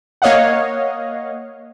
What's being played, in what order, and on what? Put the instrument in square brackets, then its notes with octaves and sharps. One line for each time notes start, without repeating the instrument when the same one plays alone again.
[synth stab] A#3 C#5 D#5 F5 F#5